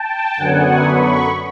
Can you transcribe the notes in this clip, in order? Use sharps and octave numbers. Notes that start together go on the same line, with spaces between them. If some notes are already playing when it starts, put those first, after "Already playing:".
Already playing: G5 A5
F#2 D3 F#3 B3 F#5 G#5
B5 C#6